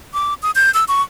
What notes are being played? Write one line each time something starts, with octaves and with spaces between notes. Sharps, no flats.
D6
D#6
G6
E6
C#6